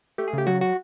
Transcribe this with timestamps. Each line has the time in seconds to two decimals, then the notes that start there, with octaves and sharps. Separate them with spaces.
0.18 A3 G4
0.28 G#4
0.33 C#3 G4
0.47 F#3 F#4
0.61 F#4